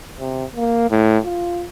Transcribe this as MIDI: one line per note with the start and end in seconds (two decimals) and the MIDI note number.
0.20 0.45 48
0.56 0.86 58
0.90 1.18 45
1.25 1.67 65